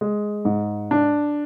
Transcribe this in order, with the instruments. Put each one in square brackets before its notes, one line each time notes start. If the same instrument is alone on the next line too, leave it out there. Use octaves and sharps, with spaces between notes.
[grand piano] G#3
G#2
D4